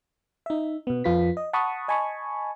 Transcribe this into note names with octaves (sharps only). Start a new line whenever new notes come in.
D#4 E5
B2 B3
F2 F3 F4 B4 B6
D#5
F#5 A5 B5 C#6 D#6
D#5 G#5 A5 B5 C#6